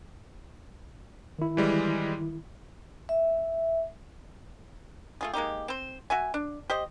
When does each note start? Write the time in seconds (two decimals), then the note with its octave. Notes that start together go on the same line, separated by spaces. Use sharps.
1.39 D#3 E4
1.57 E3 G3 G#3
3.09 E5
5.21 A3 F4 G#4
5.33 G#3 A#3 D#4 G4
5.68 C4 C5
6.10 F#4 E5 G#5
6.34 D4
6.70 G4 C5 D#5